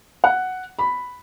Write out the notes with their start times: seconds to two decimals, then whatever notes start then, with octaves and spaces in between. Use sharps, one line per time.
0.24 F#5
0.79 B5